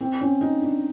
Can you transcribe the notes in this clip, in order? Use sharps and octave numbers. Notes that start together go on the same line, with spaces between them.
C4
C#4
D#4
D4